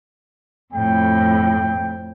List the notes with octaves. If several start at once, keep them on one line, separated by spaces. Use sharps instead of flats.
F2 A2 G5